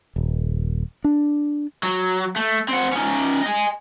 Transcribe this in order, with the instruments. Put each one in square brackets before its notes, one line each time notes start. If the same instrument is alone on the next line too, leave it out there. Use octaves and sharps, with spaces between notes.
[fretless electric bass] D#1
D4
[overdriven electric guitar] F#3
A3
C4 F#5
C#4 D#4
D#5 G#5